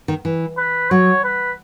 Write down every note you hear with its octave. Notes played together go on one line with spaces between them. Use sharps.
D#3
E3
B4
F#3 C#5
B4